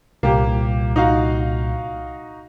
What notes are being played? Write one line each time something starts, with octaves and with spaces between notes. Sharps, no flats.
C2 A#2 A#3 G4
D#4 F#4 F5